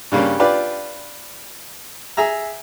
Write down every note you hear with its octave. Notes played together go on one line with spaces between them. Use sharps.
G2 C#3 G3 A#3 C#4
D4 F4 G4 B4 D5
G#4 E5 A#5